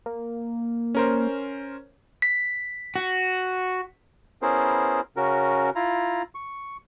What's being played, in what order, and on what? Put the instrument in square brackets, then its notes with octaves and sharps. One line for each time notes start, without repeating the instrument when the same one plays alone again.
[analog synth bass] A#3
[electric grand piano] C#4 A#4 C5
[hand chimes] B6
[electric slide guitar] F#4
[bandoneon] B3 C#4 E4 G#4 A#4 C5
C#3 C#4 F#4 A#4
E4 F4 A#5
C#6